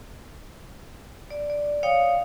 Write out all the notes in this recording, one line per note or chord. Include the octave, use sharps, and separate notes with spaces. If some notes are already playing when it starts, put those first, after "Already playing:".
D5
D5
C#5 F5 G5 D#6